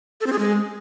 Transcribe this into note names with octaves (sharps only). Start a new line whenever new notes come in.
A4
C4
G#4
G#3